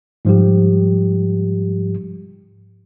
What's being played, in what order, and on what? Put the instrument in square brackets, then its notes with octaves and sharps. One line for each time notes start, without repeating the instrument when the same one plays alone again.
[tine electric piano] G#2 F3 G3 G4